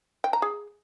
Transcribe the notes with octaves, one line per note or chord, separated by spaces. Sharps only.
G5
A#5
G#4